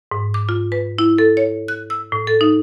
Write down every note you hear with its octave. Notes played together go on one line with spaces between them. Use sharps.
G#2
D6
F4
B4
E4
A4
C#5
F#6
E6
A2
A4
D#4